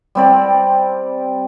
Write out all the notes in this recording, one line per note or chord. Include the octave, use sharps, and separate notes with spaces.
G3 C4 D5